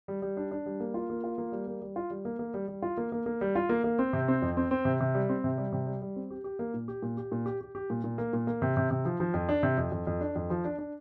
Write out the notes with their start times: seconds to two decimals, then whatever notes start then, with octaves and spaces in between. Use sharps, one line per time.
0.08 G3
0.22 G3
0.37 D4
0.51 D4
0.66 G3
0.80 A#3
0.94 F4
1.10 A#3
1.24 F4
1.38 A#3
1.52 G3
1.67 A#3
1.82 G3
1.96 F4
2.10 G3
2.25 A#3
2.39 A#3
2.54 G3
2.68 G3
2.82 F4
2.97 A#3
3.12 A#3
3.26 A#3
3.41 G3
3.55 F4
3.69 A#3
3.84 A#3
3.99 C4
4.13 C3
4.28 C4
4.42 F2
4.57 C4
4.71 C4
4.85 C3
5.00 C3
5.15 G3
5.29 C4
5.44 C3
5.58 G3
5.72 C3
5.86 G3
6.02 G3
6.16 C4
6.30 G4
6.44 G4
6.59 A#3
6.74 A#2
6.88 G4
7.02 A#2
7.17 G4
7.32 A#2
7.46 G4
7.61 G4
7.75 G4
7.90 A#2
8.04 A#2
8.18 A#3
8.33 A#2
8.47 A#3
8.62 C3
8.77 C3
8.91 C3
9.05 F3
9.20 F3
9.34 F2
9.49 D4
9.63 C3
9.78 F2
9.92 F2
10.07 F2
10.21 D4
10.36 F2
10.50 F3
10.65 D4
10.79 D4